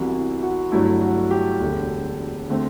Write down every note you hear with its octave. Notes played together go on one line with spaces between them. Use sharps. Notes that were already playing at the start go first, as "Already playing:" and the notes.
Already playing: C2 C3 E3 B3 F#4
E4
F#4
G1 G2 F#3 A3 E4
F#4
G4
E1 D2 D3
D3 A3 C4